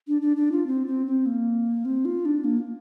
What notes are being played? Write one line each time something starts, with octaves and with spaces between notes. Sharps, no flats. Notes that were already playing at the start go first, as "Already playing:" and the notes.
D4
D4
D4
F4
C4
C4
C4
A#3
C4
F4
D4
A#3